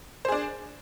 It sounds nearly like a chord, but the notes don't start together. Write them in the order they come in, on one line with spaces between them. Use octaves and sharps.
C5 G#4 D4